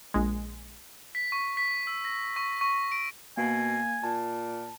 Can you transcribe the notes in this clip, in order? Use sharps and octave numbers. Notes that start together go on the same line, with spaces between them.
A#1 G#3
B6
C#6
B6
E6
A#6
C#6
C#6
D7
B2 A#3 G#5
A#2 A5